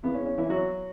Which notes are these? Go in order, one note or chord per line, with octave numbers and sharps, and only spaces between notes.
E2 C#3 E3 B3
C#4
C#4
E3 E4
F#3 F#4